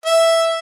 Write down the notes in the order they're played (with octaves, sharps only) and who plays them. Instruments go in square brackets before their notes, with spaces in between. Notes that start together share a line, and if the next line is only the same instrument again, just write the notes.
[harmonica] E5